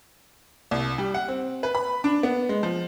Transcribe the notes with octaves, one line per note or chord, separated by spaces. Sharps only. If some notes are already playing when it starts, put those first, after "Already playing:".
C2
G3
F#5
C4
B4
B5
D4
B3
G#3
F3